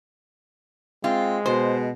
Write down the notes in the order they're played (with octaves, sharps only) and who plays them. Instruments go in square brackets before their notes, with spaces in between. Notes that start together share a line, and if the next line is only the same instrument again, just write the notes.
[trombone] G#3 [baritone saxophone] C4 [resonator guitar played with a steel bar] F4
[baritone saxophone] B2 [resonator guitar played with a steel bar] C5